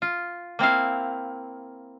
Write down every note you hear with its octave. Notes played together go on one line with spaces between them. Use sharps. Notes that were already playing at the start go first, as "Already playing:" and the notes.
F4
A#3 C4 E4 F5